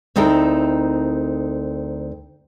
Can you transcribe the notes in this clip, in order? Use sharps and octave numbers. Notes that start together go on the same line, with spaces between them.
D2 C4 D#4 E4 A4 A#4